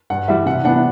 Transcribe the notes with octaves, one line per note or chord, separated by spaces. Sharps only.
G2 F#5
E3 G3 E5
C3 F#5
E3 B3 D4 F#5